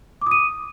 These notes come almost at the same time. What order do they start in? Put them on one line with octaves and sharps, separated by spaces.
D6 D#6 D#7